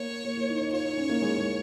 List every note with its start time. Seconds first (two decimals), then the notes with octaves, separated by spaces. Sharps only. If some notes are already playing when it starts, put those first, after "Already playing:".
Already playing: A#3 C#5
0.25 A#3
0.37 A#3
0.49 D#4
0.60 D#4
0.73 F4 C#5
0.85 D#4
0.97 C#4
1.09 A#3
1.22 G#3
1.38 G#3